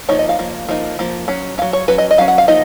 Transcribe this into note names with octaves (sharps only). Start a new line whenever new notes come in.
F3 A#3 D#4 C#5
D#5
F5
F3 A#3
F3 A#3 D#4
F3 A#3
F#3 C#4
F#3 C#4 F5
C#5
F#3 C#4 B4
D#5
D#5
F#3 C#4 F5
F#5
F5
F3 A#3 D#4 D#5